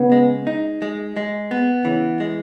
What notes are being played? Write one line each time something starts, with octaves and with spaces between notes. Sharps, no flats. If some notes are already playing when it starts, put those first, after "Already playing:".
Already playing: C#3 B3
G#3
D#4
G#3
G#3
B3
C#3 E3
G#3